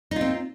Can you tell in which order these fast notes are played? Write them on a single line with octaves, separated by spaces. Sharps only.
D#4 F4 C4